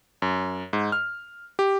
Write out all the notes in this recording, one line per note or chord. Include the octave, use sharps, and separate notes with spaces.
F#2
G#2
F6
G4